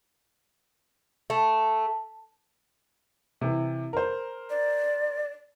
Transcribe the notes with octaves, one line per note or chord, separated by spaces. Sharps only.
A3
C3 E3
A#4 C5
D5